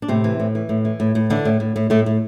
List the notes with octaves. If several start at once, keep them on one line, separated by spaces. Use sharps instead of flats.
D4
A2 C3 C4
E3
A2
E3
A2
E3
A2
A2
D3 E3 D4
A2
A2
A2
A2 A3
A2